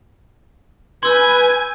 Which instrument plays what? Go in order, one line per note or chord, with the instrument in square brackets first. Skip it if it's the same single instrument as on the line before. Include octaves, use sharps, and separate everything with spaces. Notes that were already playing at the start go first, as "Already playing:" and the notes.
[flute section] B4 [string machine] G#5 [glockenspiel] C6 E6 G6 [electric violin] G#6